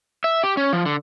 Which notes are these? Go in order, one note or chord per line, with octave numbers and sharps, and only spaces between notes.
E5
G4
C#4
F3
D3